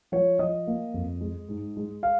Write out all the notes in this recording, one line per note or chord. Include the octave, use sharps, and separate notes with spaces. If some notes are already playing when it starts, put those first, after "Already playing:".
F3 C#5
F3 D#5
A#3
F2
G#3
G#2
G#3
F5